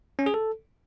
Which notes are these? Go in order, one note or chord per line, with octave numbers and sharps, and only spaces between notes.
C#4
G#4
A4